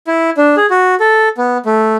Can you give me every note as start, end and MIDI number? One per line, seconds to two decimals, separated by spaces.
0.07 0.30 64
0.37 0.55 62
0.57 0.66 68
0.70 0.95 66
1.00 1.29 69
1.37 1.58 59
1.66 1.97 57